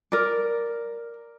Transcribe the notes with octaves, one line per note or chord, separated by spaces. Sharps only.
A#4 D5